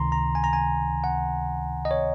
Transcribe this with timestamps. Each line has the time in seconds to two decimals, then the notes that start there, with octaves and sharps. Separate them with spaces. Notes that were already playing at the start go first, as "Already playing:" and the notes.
Already playing: C#2 C3 D#3 A#5 C6
0.12 A#5
0.35 G#5
0.44 A#5
0.53 G#5
1.04 F#5
1.85 D#5
1.91 C#5